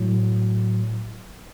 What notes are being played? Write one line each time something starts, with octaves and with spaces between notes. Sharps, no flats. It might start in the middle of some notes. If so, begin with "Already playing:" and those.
Already playing: A2 F#3